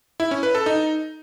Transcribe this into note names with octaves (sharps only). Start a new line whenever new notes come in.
E4
C#4
B4
A4
D#4